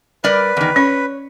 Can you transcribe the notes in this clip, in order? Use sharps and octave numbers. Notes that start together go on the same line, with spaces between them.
G3 A#4 B4 D5
E2 D#3
C#4 C#5